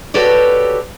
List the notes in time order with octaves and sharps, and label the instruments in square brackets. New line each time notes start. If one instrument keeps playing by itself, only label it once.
[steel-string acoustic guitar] F#4 G4 A4 B4 C#5 D5